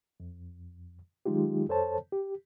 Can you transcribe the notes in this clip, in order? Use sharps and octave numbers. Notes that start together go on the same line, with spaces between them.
F2
D#3 F#3 G#3 D#4 F4 G4
F2 A4 C5 C#5 A5
G4